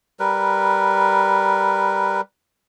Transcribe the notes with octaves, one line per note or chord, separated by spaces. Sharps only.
G3 A#4 B4